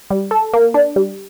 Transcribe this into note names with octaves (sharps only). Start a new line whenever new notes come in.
G3
A4
A#3
D4
G3